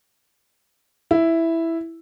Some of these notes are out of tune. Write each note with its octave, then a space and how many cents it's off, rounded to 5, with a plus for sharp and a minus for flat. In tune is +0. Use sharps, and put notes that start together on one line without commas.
E4 +0